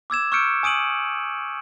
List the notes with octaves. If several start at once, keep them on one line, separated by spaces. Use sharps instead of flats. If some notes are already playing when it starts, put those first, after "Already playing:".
D6 E6 G#6 E7
C#6 E6 F6 G6 C#7 D7
G#5 D#6 D7 D#7 F#7